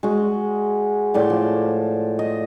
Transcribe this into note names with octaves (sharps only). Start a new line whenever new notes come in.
G#3 F#4
A2 D5 C6
F3
D#5